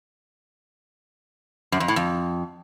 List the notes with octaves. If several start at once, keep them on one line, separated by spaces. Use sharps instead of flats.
F#2
F2
A2
F2